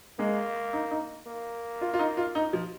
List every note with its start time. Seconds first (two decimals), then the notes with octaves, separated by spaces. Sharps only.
0.19 G#3 A#3
0.73 D#4
0.91 D#4
1.27 A#3
1.81 F4
1.93 F4
1.99 D#4
2.17 F4
2.35 D#4
2.53 F3